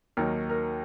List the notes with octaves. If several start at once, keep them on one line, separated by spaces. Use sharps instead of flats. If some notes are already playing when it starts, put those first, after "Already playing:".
D#2 D#3 F#3 A#4
A#4